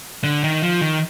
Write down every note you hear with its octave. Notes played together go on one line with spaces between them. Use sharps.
D3
D#3
F3
D#3